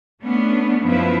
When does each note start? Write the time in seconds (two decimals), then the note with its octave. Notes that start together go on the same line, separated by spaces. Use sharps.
0.21 A3 B3 C#4 D4
0.84 F#2 F3 E4 B4 E5